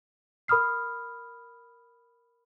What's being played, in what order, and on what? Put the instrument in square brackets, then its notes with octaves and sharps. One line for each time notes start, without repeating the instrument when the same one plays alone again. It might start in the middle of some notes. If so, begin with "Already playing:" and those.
[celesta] A#4 B5 D#6 F6 C7